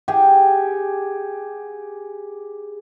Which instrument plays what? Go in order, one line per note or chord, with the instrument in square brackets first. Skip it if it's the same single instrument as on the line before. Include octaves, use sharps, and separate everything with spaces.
[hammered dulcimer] G4 G#4 F#5